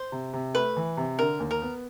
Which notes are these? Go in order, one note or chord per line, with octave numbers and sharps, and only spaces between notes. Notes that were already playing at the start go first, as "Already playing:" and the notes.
Already playing: C5
C3
C3
A3 B4
E3
C3
D3 A#4
D#2
A#4
B3